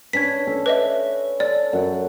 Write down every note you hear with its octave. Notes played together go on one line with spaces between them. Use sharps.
C#4 D4 B4 G#6 B6
C#4 A4
B4 D#5 E5
A4 D5
F#2 F#5